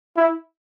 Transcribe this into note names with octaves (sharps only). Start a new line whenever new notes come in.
E4